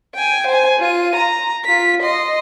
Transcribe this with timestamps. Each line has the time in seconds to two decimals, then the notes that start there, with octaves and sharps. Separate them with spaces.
0.14 G5 G#5
0.47 C5 G#5
0.79 F4 D#7
1.15 A#5
1.65 F4 B6
2.02 D#5 C6